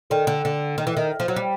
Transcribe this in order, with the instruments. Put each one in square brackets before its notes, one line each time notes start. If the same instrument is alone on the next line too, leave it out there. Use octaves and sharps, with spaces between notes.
[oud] D#3 [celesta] A4 D5 G5
[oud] D3
D3
D#3
E3
D#3
F3
F#3
G3